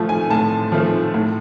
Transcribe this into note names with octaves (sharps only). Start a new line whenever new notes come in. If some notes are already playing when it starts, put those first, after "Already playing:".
Already playing: A2 F3 A3
G#5
A2 A5
F3 A3
A2